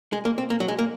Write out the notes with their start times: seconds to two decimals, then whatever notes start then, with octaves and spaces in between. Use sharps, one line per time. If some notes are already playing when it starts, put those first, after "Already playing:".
0.13 G#3
0.25 A#3
0.38 C4
0.50 A#3
0.60 F#3
0.68 G#3
0.79 A#3